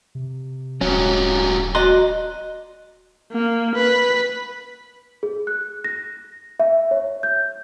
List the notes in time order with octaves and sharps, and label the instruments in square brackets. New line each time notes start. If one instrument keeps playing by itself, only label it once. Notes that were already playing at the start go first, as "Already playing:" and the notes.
[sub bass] C3
[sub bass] D#1 [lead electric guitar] G#2 F#3 [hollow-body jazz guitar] C#4
[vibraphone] F#4 D#5 [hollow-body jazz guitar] D5 A#5 C6
[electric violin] A#3
B4
[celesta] G#4
F#6
A#6
E5
C#5
G6